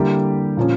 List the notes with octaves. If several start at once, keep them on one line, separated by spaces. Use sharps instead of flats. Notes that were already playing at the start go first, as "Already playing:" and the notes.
Already playing: D3 G3 A#3 E4 G4
A#2 F3 C#4